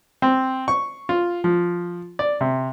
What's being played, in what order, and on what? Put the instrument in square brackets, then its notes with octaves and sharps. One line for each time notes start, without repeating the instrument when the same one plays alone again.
[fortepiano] C4
C#6
F4
F3
D5
C3